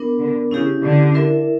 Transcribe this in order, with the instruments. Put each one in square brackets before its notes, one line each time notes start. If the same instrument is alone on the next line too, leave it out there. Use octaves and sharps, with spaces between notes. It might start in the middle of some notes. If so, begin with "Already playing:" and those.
Already playing: [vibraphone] B3 D4 A#4
[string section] D3
[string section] C#3 [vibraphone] C#4 E4 G4
[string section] D3
[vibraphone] E4 A#4 E5